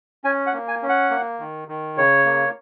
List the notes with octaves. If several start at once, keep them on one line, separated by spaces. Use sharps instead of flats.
C#4 G#5
F#5
A#3
G#5
C#4
F#5
A#3
D#3
D#3
C#3 C#5
A#3